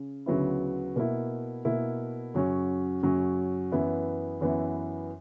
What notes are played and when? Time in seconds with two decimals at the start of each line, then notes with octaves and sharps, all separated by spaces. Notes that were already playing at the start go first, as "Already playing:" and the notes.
Already playing: C#3
0.26 D2 C#3 F#3 B3 E4
0.96 B2 A#3 E4
1.65 B2 A#3 E4
2.34 F#2 C#3 F#3 C#4
3.02 F#2 C#3 F#3 C#4
3.72 F#2 E3 B3 E4
4.41 F#2 E3 B3 E4